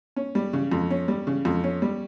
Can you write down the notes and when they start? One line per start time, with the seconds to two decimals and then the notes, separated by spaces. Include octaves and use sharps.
0.16 C#4
0.35 G3
0.53 C#3
0.72 F2
0.90 C#4
1.08 G3
1.27 C#3
1.45 F2
1.64 C#4
1.82 G3